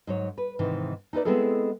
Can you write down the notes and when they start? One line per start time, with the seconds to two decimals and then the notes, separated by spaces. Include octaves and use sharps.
0.07 G#2 F#3 C#5
0.38 B4
0.59 G#2 C3 D#3 E3
1.13 D#4 E4 B4 D5
1.25 G#3 B3 C4 E4 G#4 A4